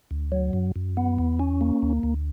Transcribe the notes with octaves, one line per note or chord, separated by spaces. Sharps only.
D2
F#3
F#2
F#2
B3
E2
C#4
A#3
D2
D2